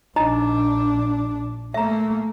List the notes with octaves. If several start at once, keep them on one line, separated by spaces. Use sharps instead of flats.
A#1 D4 D#4 D#5 A#5
A3 A#3 E5 A#5